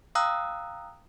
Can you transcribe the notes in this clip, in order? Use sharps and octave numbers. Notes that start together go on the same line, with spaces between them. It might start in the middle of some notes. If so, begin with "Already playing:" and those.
F5 G5 A#5 D#6 E6 F#6